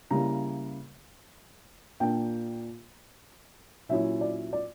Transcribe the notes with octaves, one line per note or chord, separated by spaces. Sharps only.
C#3 G3 A#3 E4 A#5
A#2 A#3 D4 G5
A#2 F#3 C#4 E4 E5
D5
D5